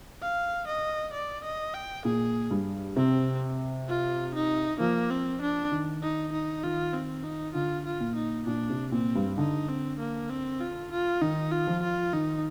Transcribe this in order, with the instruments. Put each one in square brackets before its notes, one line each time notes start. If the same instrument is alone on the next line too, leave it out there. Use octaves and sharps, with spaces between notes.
[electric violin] F5
D#5
D5
D#5
G5
[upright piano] A#2 [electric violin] G#4
[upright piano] G2
[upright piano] C3 [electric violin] C4
[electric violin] F4
D#4
[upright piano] F3 [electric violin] A#3
[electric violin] C4
D4
[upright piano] D#3
[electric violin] D#4
D#4
[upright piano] D#3 [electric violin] F4
[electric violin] C4
D#4
[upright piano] D3 [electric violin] F4
[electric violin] F4
[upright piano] A#2
[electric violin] D#4
[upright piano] A#2 [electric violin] D4
[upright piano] C3
[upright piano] A#2 [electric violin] C4
[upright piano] G2
[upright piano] D3 [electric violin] D#4
[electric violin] C4
A#3
C4
F4
F4
[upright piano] D#3 [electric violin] D#4
[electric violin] F4
[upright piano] F3
[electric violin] F4
[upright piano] D#3 [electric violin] D#4